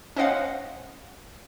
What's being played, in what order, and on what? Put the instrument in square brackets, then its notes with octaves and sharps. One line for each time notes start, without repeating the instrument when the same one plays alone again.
[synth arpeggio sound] C#4 C5 D#5 F5 F#5